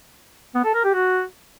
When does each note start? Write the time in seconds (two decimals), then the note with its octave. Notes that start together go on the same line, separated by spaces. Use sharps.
0.55 B3
0.65 A4
0.74 A#4
0.84 G4
0.93 F#4